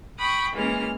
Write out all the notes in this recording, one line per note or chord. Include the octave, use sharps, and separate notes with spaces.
G5 B5 C#6 D#6 F#6
E3 G#3 A#3 C#4 F6